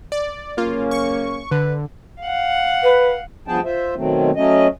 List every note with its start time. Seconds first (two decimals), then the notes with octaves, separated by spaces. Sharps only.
0.12 D5
0.58 F#2 C#3 A#3 C#4 F4
0.91 C#6
1.52 D3 B4
2.21 F5 F#5
2.83 B4
3.48 G2 F3 B3 G#4 G5 A5
3.64 F4 C5 E5
3.96 B2 D#3 F#3 A3 C4
4.36 F#3 A3 C#4 D#5